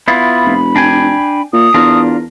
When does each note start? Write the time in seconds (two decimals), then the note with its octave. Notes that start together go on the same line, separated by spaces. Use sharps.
0.08 B3 E4 F4 B5
0.45 F1
0.76 D4 G5 G#5
1.53 A#2 D#6
1.74 E2 D4 F4 A#4